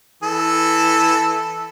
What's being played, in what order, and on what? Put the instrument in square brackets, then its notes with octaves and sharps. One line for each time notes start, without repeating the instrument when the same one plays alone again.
[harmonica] E3 A4